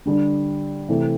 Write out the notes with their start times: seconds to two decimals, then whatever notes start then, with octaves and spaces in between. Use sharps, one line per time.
0.06 D3 G3 D4
0.89 C3 E3 A3